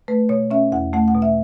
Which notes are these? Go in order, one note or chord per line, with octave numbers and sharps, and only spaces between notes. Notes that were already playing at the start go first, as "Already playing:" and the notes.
A3 B4
B2 C#5
C#4 E5
E2 F#5
A3 F#5
F#5
B2
E5